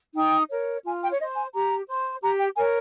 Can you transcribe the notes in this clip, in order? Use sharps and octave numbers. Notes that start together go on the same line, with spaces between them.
D#4 G5
A#4 C#5
F4 G#5
G5
C#5
C5 D#5
G#5
G4 A#5
C5
G4 A#5
G5
A#4 C#5 G#5